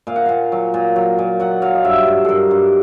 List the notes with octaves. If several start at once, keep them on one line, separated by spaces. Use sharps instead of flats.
A#2 F5
F#5
A#2 F5
F#3
A#2
F#3
A#2
F#3 F#5
F#3 F5
D#5
G2 E5
G2
G2 A4 A#4
G2